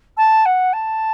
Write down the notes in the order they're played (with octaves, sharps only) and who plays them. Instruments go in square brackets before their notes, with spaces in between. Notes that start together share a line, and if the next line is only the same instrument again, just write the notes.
[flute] A5
F#5
A5